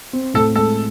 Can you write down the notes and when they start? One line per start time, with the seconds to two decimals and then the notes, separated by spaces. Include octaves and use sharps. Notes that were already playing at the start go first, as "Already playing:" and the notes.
0.13 C4
0.34 A2 A4
0.55 G#3 A4